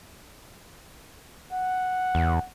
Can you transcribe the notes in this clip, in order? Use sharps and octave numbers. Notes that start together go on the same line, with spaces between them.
F#5
E2